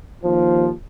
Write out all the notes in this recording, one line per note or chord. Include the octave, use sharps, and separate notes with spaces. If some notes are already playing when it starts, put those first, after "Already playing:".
D#2 F3